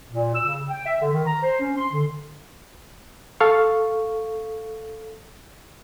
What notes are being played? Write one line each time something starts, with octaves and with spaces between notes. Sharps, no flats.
A#2
E6
C#3
G5
E5
D3
D#3
A#5
C5
C#4
C6
D3
A4 F5 C#6